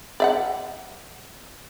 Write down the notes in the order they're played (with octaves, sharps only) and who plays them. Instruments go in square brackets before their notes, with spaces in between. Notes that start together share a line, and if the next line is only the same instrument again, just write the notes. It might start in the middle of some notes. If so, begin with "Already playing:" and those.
[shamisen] D5 E5 F#5